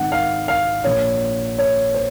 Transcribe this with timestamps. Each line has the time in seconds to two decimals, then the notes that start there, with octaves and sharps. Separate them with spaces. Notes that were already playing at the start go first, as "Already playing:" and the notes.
Already playing: G#1 G#2 D#3 F#5
0.12 F5
0.48 F5
0.84 A#1 A#2 C#5
1.59 C#5
1.94 C5